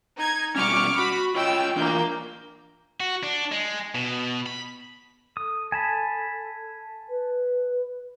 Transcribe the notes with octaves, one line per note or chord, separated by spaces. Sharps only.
D#4 G#6
B2 G3 C#4 C#6 D6 F6
F#4 B5
F4 C#5 D#5 G5 E6
E3 A#3 D4 F4 G6
F#4
D4
G#3
B2
B5
A4 D#6
G#5 A5 B5
B4